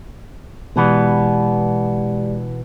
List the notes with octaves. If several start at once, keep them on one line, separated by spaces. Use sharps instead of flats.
B2 E3 G#3 B3 G4 D5